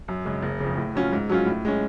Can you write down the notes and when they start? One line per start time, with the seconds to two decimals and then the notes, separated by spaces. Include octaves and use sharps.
0.08 F#2
0.25 C#3 G#3
0.43 F#1
0.60 F2 C#3
0.77 A2
0.95 F#3 C#4 F4
1.12 G#2
1.29 F#3 C#4 F4
1.46 A2
1.65 G#3 C#4